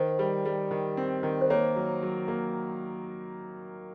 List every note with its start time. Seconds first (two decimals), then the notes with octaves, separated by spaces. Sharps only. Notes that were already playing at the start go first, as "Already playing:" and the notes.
Already playing: D#3 C5
0.19 G3
0.45 G3
0.71 D#3
0.97 C4
1.23 D#3
1.41 C5
1.50 A#3 C#5
1.76 F#3
2.02 F#3
2.28 A#3